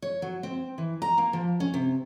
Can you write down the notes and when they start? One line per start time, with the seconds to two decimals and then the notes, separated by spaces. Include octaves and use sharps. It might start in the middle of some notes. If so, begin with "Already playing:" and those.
0.02 C#5
0.22 F#3
0.43 C4
0.78 E3
1.02 A#5
1.18 A#3
1.33 F3
1.60 C#4
1.74 C3